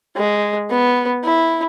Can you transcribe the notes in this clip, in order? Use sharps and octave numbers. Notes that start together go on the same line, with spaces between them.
G#3
B3
E4